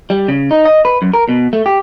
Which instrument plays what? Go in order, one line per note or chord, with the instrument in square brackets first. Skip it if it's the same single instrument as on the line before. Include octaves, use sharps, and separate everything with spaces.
[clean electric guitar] G3
C#3
D#4
D#5
B4
F#2
A#4
B2
A3
G4